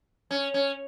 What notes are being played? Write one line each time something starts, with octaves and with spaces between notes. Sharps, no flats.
C#4
C#4